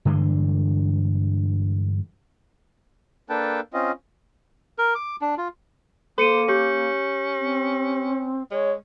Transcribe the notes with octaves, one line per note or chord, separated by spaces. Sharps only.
G2 D3 E3 G#3
A#3 D4 A4 B4 G5 A5
C4 C#4 F4 D#5
A#4
D6
D4
F4
A#3 A4 C5 C#7 D#7
C#4 G4 G6
C4
G#3 C#5